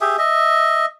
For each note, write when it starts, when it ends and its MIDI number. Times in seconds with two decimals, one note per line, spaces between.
0.01 0.16 67
0.01 0.16 68
0.01 0.16 76
0.18 0.86 75
0.18 0.86 76